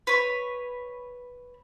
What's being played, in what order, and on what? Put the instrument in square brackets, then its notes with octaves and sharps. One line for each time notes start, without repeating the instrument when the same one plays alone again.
[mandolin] B4 C#5